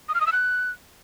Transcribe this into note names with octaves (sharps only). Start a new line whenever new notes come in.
D#6
F6
D#6
E6
F#6